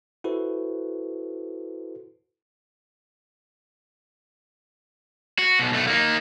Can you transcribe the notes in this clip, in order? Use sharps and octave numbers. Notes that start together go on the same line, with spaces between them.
E4 F#4 A4 B4 C5
F#4
B1 B2
B1 A3
A#3 D#4